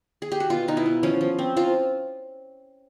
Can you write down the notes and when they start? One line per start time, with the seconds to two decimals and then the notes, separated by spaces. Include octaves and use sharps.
0.22 G#4
0.32 G4
0.40 F#4
0.50 B2 F4
0.68 B2 D#4
0.77 E4
0.86 B3
1.03 F3 C#4
1.21 F3
1.39 C4
1.56 F3 F4